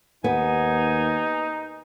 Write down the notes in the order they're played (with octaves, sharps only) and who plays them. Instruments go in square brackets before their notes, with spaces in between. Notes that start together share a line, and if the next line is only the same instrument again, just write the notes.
[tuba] D#2 [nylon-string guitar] B3 [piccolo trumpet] D#4 [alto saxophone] G#5